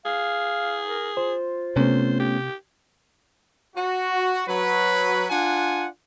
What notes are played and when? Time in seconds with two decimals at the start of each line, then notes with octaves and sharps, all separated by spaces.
0.06 G#4 F5
0.89 A#4
1.17 F4 C5
1.76 C3 A3 B3 C#4 C5
2.20 G4
3.75 F#4
4.46 F#3 B4
5.28 D4 F4 F#5 G#5